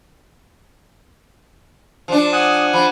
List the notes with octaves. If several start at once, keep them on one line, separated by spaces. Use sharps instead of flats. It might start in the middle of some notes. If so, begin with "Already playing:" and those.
F3 D4
F#5 G#5 D#6
F3 B5